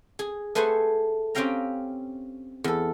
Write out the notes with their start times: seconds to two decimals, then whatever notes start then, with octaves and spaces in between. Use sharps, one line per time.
0.19 G#4
0.55 A3 G#4 B4 C5 F#5 G#5
1.35 C4 C#4 G4 F5 G5 A#5
2.64 E2 A4